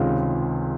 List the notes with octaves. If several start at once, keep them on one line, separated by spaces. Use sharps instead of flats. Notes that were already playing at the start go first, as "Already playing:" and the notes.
Already playing: C#2 C3 D#3 G#3 C#4 F4